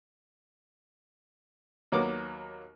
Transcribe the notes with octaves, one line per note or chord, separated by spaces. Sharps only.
D#2 F#3 A#3 B3 D6